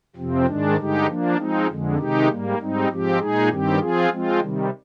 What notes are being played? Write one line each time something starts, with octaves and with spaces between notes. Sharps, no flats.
F2 C3 F3 C4
G#2 D#3 G#3 D4
G2 D3 G#3 D#4 G4
F3 A#3 D4
F3 G#3 C4 D#4
F2 D3 G#3
C3 D#3 G#3 D#4 G4
G#2 G3 A#3
G#2 G3 C4 D#4
G#2 F3 C4 G4
A#2 G#3 D#4 G#4
G2 D#3 G3 C4 G4
F3 C4 F4 G#4
F3 G#3 C4 F4
C3 D#3 G3